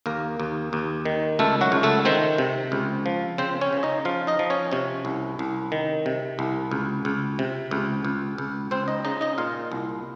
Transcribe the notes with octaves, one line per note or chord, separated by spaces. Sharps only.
D#2 A#3 A#4
D#2
D#2
D#3
C#2 A3 A4
F#3 F#4
C#2
A3 A4
D#3 C4 C5
C3
C#2
F3
C#3 C4 C5
C#4 C#5
C#3
D#4 D#5
F3 F4 F5
D#4 D#5
F3
C#4 C#5
C3 C#4 C#5
C2
C2
D#3
C3
C2
C#2
C#2
C3
C#2
C#2
C#2
C#2 C4 C5
D#4 D#5
C#3 D#4 D#5
D#4 D#5
A#2 F4 F5
C2